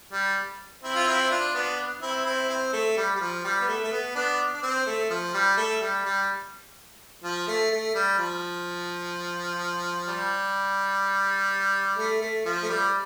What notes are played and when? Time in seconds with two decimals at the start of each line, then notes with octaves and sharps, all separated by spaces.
0.12 G3
0.83 C4 E4
0.96 F4
1.07 C4 E4
1.31 D4 F4
1.54 B3 D4
2.02 C4 E4
2.26 C4 E4
2.49 C4
2.73 A3
2.97 G3
3.15 G3
3.20 F3
3.44 G3
3.61 B3
3.68 A3
3.84 A3
3.92 B3
4.15 B3 D4
4.54 D4
4.63 C4
4.86 A3
5.10 F3
5.34 G3
5.57 A3
5.81 G3
6.05 G3
7.23 F3
7.48 A3
7.71 A3
7.95 G3
8.18 F3
10.08 G3
11.98 A3
12.21 A3
12.45 F3
12.63 A3
12.69 G3